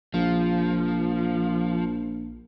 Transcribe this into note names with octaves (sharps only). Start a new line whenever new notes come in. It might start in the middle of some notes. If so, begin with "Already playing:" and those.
A#1 F3